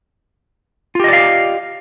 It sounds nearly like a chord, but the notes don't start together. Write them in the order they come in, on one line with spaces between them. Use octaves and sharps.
F4 G4 D#5 D5 F5